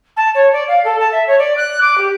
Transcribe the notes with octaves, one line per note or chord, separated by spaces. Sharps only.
A5
C#5
D5
F5
A4
A5
E5
C#5
D5
F#6
D6
G4